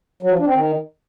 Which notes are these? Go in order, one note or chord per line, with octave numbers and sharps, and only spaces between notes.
F#3
F3
D4
C4
D#3